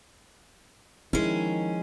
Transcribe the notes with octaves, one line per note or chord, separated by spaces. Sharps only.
D#3 F3 G#3 C#4 E4 G#4